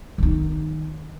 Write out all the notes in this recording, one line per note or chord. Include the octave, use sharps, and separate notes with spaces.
D#3 D#4